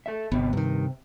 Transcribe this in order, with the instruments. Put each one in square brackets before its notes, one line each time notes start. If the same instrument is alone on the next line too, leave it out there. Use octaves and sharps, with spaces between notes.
[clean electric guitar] A4 E5
[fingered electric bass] G1 [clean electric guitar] C3 B3
[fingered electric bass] G2 D#3 [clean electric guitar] C3